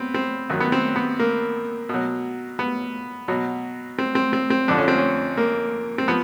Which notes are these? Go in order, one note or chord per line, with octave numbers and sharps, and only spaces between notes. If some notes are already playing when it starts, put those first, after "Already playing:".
Already playing: B3 C4
C4
F#2 D#3 F#3
B3
C4
B3
A#3
B2 F#3
B3
B2 F#3
C4
C4
C4
C4
F2 D3 F3 D4
C#4
C4
C#4
A#3
C4
F3 B3